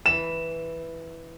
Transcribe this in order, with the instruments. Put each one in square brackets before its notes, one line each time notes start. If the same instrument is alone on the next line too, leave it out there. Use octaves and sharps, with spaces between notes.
[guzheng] E3 B5 [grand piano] E7